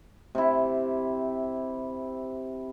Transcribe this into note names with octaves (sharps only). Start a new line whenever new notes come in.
C3 E4